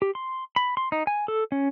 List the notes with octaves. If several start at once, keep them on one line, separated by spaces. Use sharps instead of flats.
G4
C6
B5
C6
D#4
G#5
A4
C#4